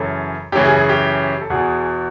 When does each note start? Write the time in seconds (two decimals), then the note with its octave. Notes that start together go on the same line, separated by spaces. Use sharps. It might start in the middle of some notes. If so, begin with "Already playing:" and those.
Already playing: F#2 C#3 E3 A4
0.52 F#2 C#3 E3 G4
0.65 G#4
0.77 G#4
0.89 G4
1.41 A4
1.50 E2 B2 G#4